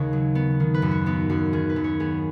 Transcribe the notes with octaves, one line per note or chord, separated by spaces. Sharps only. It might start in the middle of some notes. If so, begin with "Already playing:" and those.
Already playing: D#2 C#3 C#5 D#5
F#3
B3
D#3
B4
F#2
F#4
B3 D#4
F#2 F#4
D#3 G#4
B4
F#2
C#5
B3 G#4